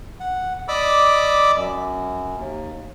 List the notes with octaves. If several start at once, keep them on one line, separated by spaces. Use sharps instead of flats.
F#5
D5 D#5 B5 D6 E6
F#2
D#2